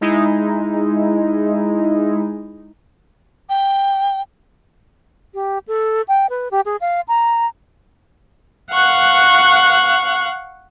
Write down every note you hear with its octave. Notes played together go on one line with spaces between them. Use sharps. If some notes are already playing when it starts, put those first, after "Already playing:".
G#3 D#4 E4
G5
G4
A4
G5
B4
G4
G#4
F5
A#5
F5 F#5 C#6 F#6